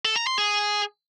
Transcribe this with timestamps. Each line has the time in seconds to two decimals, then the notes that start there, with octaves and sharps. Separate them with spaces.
0.05 A4
0.16 A#5
0.27 C6
0.38 G#4